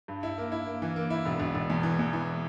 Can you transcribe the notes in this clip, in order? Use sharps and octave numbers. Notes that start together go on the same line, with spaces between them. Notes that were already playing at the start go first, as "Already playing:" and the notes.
G2
E4
A#3
E4
A#3
E3
A#3
E4
E1
E1
E1
E2
E3
E2
E3